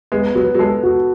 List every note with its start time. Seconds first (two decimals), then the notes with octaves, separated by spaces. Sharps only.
0.12 G#3 B3
0.35 F#3 B3
0.55 F#3
0.59 G#3 A4
0.83 F#4